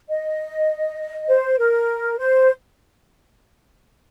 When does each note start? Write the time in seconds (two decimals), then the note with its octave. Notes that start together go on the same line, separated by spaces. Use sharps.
0.08 D#5
1.28 C5
1.58 A#4
2.18 C5